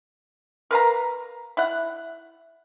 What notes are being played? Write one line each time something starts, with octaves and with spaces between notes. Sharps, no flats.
A#4 B4 F5 A#5
E4 F#5